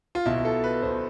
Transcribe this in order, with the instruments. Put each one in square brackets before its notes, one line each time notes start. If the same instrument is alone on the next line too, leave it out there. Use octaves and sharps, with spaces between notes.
[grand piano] F4
B1 B2 E4
A4
B4
B1 B2 C5